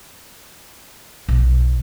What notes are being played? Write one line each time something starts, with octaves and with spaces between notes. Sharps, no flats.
B1